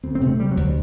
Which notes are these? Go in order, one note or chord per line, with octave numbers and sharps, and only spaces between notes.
D2 C4
C4
C3
A3
C3 G3
F#3
D2